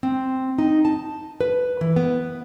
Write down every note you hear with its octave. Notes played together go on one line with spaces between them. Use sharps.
C4
D#4
A5
B4
E3
B3